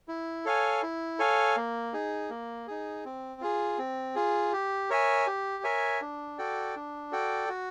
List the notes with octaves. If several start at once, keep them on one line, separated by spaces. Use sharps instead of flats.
E4
A4 C#5 F5 G#5
E4
A4 C#5 F5 G#5
A#3
D#4 G#4
A#3
D#4 G#4
C4
F4 G#4
C4
F4 G#4
G4
A#4 C#5 E5 G#5
G4
A#4 C#5 E5 G#5
D4
F#4 A4 D5 G5
D4
F#4 A4 D5 G5
F#4